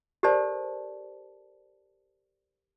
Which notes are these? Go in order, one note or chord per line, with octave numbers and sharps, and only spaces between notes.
G4 A4 A#4 C5 D5 A5